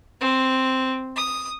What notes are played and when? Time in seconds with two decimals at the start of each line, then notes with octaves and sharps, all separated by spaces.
0.21 C4
1.16 D#6